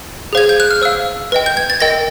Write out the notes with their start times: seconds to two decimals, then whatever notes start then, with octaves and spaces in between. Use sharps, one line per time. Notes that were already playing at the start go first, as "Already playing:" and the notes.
0.33 G#4 C5 F5 G#6
0.49 G6
0.60 F#6
0.71 F6
0.82 C5 F5 E6
1.32 B4 D#5 G5
1.46 G6
1.57 G#6
1.70 A6
1.80 A#4 D#5 G5 A#6